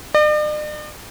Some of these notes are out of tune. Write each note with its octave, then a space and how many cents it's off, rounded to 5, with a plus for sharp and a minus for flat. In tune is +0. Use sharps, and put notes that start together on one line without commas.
D5 +45